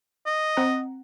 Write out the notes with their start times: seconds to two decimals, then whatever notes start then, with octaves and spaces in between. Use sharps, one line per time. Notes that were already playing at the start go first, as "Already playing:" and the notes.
0.26 D#5
0.57 C4 F#5 A#5